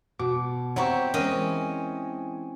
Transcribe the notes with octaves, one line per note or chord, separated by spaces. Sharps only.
B2 F#4
C4 E4 G4 C#5 F#5 A#5 C#6
E3 G#3 C4 C#4 A#4 D#5